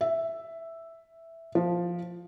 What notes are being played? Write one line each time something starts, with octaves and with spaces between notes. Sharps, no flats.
E5
F3